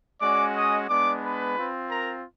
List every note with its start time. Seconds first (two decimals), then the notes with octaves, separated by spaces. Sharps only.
0.21 G#3 C#4 F#4 D5 D6
0.55 D#5 D#6
0.89 G#3 B3 D4 D5 D6
1.22 B4 B5
1.56 C4 F4
1.90 A#4 A#5